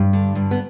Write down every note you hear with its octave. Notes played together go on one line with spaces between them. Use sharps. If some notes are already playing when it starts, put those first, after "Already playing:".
Already playing: G2 G3
D3
G2
B3